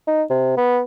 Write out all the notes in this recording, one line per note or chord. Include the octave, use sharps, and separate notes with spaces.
D#4
C3
B3